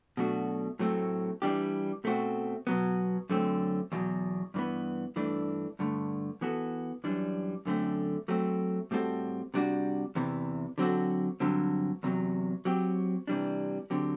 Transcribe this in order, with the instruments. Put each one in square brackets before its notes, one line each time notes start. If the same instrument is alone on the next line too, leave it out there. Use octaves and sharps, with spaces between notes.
[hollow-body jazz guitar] B2 F#3 A3 D4 F#4
A2 F#3 A3 C4
E3 G3 D4 G4
B2 A3 C4 F#4
B2 F#3 B3
F#2 D3 A3 C4
E2 B2 F#3
G2 E3 B3
G2 E3 A3 D4
G2 D3 A3
E3 B3 F#4 A4
F#2 E3 G3 D4
F#2 D3 A3 C4
F#3 A3 C4
A2 G3 C4 F#4 A4
C3 G3 D4 F#4
E2 C3 E3
D3 F#3 C4 F#4 A4
G2 D3 F#3 C4
E2 C3 F#3
F#3 C4 G4
C3 E3 G3 D4
D3 F#3 C4 G4